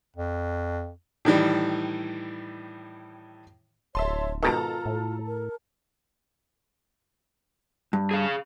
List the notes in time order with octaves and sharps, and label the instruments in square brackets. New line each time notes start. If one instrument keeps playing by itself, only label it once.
[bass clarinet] F2
[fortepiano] A2 D#3 E3 G3
[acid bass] D1 [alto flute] C#5 [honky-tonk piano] E5 A5 C6
[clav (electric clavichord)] G#2 B2 D#3 [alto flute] F4 [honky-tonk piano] A4 A5 A#5
[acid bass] A2
[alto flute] A#4
[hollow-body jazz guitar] G2
[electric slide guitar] G#4 F5